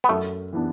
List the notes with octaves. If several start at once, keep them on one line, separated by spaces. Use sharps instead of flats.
B3
F#2 A3
E3 B3 D4